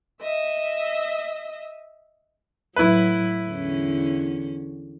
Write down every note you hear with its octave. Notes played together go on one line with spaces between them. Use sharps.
D#5 E5
A2 F#3 E4 B4
E2 D3 C#4